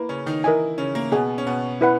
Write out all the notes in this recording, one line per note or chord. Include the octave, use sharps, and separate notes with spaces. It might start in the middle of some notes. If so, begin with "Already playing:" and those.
Already playing: A#3 E4 B4
C#3 C#4
D#3 D#4
E3 E4 A#4 D#5 G#5
C#3 C#4
A#3
B2 B3 G#4 D#5 G#5
C#4
B2 B3
E4 B4 F#5